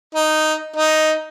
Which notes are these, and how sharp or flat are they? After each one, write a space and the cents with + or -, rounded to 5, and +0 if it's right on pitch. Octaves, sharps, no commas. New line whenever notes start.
D#4 -5
D#4 +0